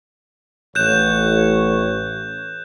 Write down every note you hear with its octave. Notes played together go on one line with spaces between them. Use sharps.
A1 C#5 F#6 G6 E7